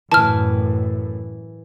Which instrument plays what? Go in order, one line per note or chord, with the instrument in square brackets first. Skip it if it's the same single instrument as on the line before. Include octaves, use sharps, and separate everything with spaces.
[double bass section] F#2 A2 [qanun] E3 [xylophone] A5 F6